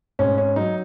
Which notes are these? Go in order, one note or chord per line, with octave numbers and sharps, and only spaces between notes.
G#2 C#4
C#4
F#3 D#4